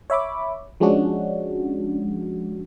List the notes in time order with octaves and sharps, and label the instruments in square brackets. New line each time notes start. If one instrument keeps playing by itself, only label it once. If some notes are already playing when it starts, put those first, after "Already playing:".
[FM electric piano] C#5 E5 B5 D6
F3 G#3 C#4 D4 F#4